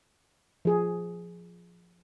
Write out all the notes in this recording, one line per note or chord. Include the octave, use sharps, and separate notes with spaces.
F3 G#4